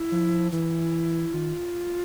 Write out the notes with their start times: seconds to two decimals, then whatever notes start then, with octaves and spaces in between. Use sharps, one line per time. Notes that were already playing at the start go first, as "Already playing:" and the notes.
Already playing: E4
0.12 F3
0.52 E3 E4
1.34 D#3 F4